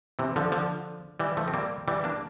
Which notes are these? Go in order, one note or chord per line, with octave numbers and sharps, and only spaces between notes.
C3 E3
D3 F3
D3 F3
E3 G3
F3 A3
C4
G3 A#3
E3 G3
A#3 D4